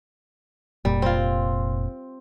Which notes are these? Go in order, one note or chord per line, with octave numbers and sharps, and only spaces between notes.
F1 A#2 G3
C4 F4